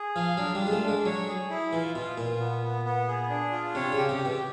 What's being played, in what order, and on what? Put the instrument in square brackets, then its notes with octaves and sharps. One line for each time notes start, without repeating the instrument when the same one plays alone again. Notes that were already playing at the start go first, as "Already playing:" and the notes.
Already playing: [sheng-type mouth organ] G#4
[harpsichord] F3 [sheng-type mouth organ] F5
[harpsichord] F#3 [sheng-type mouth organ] D4
[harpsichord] G3
[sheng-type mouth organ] F4
[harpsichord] G#3
A3
[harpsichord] G#3 [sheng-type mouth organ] D4
[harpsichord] F#3 [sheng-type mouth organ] C#5
[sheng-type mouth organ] G#4
E4
[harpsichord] E3 [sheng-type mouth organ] F4
[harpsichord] B2 [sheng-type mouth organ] F4
[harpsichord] A#2 [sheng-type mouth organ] F4
[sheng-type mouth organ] B3
B3
B3
G#4
D4
F4
[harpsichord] C3 [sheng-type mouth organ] C#5
[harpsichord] C#3 [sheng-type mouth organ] G4
[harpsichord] C3
[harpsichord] B2 [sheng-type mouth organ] G4